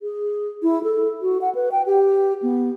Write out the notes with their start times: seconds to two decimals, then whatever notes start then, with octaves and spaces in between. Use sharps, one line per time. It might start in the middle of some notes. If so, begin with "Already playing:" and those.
0.02 G#4
0.63 E4
0.84 A4
1.22 F#4
1.41 F#5
1.55 B4
1.72 G5
1.86 G4
2.43 B3